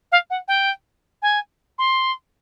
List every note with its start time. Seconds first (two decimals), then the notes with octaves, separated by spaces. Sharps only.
0.12 F5
0.30 F#5
0.48 G5
1.22 G#5
1.78 C6